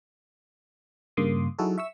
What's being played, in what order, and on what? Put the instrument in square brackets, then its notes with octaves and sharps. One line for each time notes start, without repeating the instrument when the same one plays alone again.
[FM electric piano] G2 C#3 A#3 C6 D6 D#6
F#3 D#4 E4 F#4 G#4 A4
E5 C#6 E6